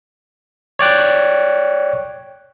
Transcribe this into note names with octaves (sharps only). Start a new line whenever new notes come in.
C#5 D5 G5 F#6